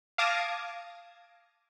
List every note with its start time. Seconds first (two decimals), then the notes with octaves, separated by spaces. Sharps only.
0.18 F5 A5 D6 D#6 G#6 A#6